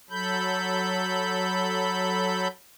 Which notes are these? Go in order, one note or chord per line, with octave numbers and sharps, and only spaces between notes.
F#3 A4 B5 G6